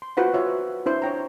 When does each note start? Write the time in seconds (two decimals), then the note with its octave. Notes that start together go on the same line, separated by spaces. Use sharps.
0.02 C6
0.17 F4 F#4 B4 C5 F#5
0.34 F4 B4 C#5 E5
0.86 D4 E4 C5
1.02 C#5 G5 A#5